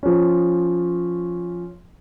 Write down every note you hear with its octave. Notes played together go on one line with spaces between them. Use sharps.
F3 C#4